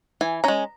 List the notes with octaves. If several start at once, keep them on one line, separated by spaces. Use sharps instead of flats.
E3 G#5
G#3 C#4 A#5